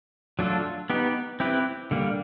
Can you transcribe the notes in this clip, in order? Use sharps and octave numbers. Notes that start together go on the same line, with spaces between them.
F#3 A3 D4 F4 A4
B3 D#4 G4 B4
C4 E4 G4 B4
D3 G3 A#3